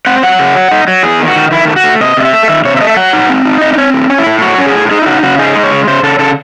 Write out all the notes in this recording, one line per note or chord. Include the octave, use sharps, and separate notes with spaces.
C4 F#5
F#3 F#5
C#3
F#3
D#4
F#3
E2 G#4
D#3
F#4
D#3
D#3 E4
A3
F#4
A3
C3 D#5
C3 D#5
E5
A3
D#3 E5
C3 C#5
E5
A3 D#5
E5
F#3 F#5
D#4
C4
D#4
C4 D#5
D#5
C4 C#5
A2
C#4
E4
A2
F#3 F#4
C#4
G#4
A2
D#4 G#4
E4
C#3 F#4
C#3 F#4
D#4 G#4
G#3
C#5
C#3
C#3 C5
C#3 A4
C#3 A4